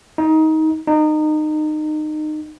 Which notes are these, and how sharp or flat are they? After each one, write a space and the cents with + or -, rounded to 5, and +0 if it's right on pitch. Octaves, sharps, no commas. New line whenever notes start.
D#4 +20
D#4 -25